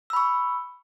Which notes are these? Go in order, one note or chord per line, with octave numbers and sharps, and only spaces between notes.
B5 C#6 E6